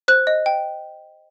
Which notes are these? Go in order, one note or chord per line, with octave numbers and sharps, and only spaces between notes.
C5 F#6
D#5
G5